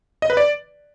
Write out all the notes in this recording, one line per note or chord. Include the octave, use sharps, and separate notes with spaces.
D#5
B4
D5